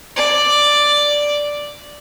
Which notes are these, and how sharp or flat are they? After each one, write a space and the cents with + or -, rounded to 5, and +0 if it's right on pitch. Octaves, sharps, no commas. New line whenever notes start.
D5 +0